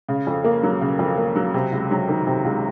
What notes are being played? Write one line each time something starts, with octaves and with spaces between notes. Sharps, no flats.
C#3
F2
A#3
F#3
C#3
F2
A#3
F#3
C3
C#2
F#3
D#3
C3
C#2